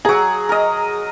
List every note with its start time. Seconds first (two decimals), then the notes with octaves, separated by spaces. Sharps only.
0.05 F#3 G#4 A#5
0.49 A#4 D#5